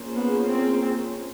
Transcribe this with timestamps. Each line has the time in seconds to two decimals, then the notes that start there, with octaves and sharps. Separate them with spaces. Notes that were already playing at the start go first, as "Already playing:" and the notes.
Already playing: A#3 C#4 F4 G#4 C5
0.16 B3
0.47 C4